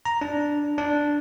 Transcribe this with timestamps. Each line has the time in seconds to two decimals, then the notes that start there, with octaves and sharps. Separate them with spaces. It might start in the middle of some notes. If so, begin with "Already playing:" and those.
0.05 A#5
0.21 D4
0.78 D4